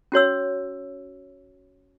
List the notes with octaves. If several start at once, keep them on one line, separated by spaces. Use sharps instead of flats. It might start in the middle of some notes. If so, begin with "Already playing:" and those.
C#4 F#4 C#5 E6